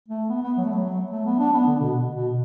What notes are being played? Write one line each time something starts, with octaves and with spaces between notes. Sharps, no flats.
A3
B3
B3
F#3
A3
F#3
A3
B3
D4
B3
D3
B2
B2